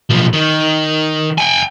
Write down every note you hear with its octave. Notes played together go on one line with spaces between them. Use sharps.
B1 F3
D#3
G5 G#5